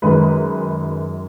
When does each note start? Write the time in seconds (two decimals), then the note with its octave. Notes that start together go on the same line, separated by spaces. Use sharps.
0.02 F#2 D#3 G#3 B4